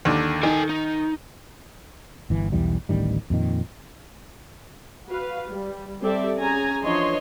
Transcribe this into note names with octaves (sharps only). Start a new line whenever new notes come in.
D#2 D3
D#3 A4 G5 G#5
D#4
G1 E3
B1 E2 E3 G3
D1 A1 D#3 G3
F2 A#2 D#3
F#4 B4 F5
G3
G3 C4 G4 A4 D5 E5
C#4 G#4 G#5 A#5
E3 F3 D4 C#5 D#5 C6